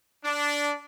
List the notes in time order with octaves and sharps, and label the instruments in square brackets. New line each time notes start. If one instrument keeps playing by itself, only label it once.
[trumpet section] D4